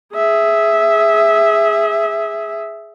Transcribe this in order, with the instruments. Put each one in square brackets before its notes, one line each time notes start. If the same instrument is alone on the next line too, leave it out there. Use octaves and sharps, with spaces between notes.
[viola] G#4 E5